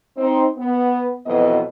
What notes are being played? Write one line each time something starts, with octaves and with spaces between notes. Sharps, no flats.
C4 D#4 C5
B3
F2 B2 E3 F#3 B3 D#5